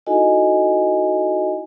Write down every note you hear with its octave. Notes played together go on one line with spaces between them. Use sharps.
D#4 E4 F#4 A4 D#5 G#5